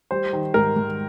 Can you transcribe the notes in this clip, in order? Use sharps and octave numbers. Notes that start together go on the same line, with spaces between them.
G3 C5
D#3
G#2 A#4
G#2